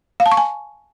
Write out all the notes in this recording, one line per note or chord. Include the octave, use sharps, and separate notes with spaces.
F5
A5
C#6
G#5